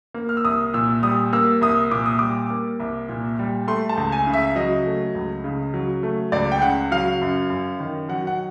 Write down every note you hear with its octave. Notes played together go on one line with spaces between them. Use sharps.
A#3
F6
E6
C2 D#6
A#2 E6
G3 D#6
A#3 E6
C2 D#6
A#2 D6
D#6
G3 D6
A#3
C2
A#2
G3
A3 C6
A5
C#2
G#5
C#3
E5
F#3 D#5
A3
C#2
C#3
F#3
A3
C#2 D5
G5
C#3 F#5
F#3 F5
F#2
F#2
D#3
F#3 F#5
F#5